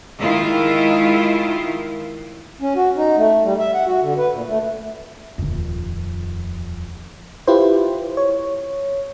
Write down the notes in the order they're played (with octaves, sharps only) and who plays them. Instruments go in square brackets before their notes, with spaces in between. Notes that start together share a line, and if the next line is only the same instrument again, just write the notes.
[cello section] D#3 G#3 E4 F4
[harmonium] C#4
F#4
D#4
A3
G3
E5
F#5
F#4
D3
B4
A#2
A3
[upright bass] D#1 F2
[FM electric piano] E4 F4 G4 B4 C5
C#5